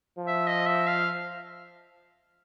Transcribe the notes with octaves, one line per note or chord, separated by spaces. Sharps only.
F3
E5
D#5
E5
F5